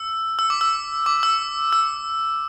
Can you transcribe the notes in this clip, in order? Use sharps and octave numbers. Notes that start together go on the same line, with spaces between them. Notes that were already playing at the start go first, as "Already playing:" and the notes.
Already playing: E6
E6
D6
E6
D6
E6
E6